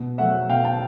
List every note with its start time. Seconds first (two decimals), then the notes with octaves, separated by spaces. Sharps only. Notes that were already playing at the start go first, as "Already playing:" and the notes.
Already playing: B2
0.18 F#3 A3 E5 F#5
0.49 B2 F5 G5
0.64 G5 A5